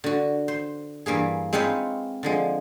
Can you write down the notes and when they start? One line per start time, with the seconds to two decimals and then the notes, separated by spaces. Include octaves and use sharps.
0.04 D3 F#4
0.48 C5
1.06 G2 E3 A#3 G#4
1.53 G#3 C4 D#4 F4 B4 C#5
2.23 D3 F3 G#3